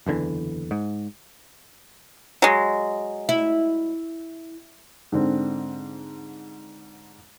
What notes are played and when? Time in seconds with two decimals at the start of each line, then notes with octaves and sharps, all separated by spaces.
0.06 F#1 E2 D3 E3
0.71 G#2
2.42 F#3 G#3
3.29 E4
5.12 G#2 D3 C4